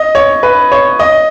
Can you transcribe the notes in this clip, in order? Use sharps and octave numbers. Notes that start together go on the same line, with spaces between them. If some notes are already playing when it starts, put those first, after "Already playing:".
Already playing: D#5
C#5
B4
C#5
D#5